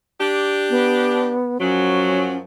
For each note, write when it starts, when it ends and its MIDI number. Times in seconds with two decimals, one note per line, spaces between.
0.21 1.36 62
0.21 1.36 67
0.70 1.58 59
1.60 2.42 42
1.60 2.42 53
1.60 2.42 54
1.60 2.36 61